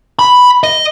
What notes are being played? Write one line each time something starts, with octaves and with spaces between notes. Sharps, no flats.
B5
D#5